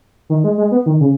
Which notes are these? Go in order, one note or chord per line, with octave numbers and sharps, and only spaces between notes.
D#3
G#3
G#3
B3
D#3
C#3